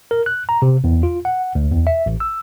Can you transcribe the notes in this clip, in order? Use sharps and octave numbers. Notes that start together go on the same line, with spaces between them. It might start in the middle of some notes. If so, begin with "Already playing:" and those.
A#4
F#6
A#5
C3
E2
F4
F#5
D2
E2
E5
A1
E6